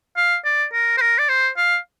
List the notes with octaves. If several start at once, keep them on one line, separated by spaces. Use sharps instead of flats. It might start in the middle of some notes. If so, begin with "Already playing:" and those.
F5
D5
A#4
C5
A#4
D5
C5
F5